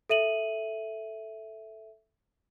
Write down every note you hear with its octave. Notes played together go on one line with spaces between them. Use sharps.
A4 E5 D#7 F#7